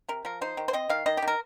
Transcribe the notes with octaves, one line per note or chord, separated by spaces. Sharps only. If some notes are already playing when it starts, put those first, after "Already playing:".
C3 A#4
F3 A#4
D#4 C5
D#3
C5
C4 D#5
D#3 F5
D#3 D#5
G4
D#3
A#4